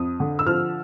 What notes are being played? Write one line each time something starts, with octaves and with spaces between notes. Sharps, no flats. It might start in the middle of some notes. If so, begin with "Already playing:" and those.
Already playing: F2 D#6
D3
E6
F3 F6